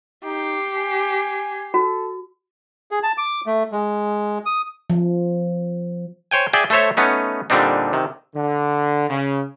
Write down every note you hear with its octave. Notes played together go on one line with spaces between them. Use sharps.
D#4 G4 C7
G#5
F#4 A4
G#4
A5
D6
A3
G#3
D#6
F3
C5 C#5 G5 G#5
G#4 D5 E5 G5 G#5
A3 A4 C5 C#5 E5
A3 B3 C#4 D#4
A#2 D3 G3 C4 D4 D#4
C3 D#3
D3
C#3